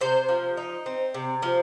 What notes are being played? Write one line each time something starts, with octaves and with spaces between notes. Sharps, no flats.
C3 C5
F3
D#4
C4
C3
F3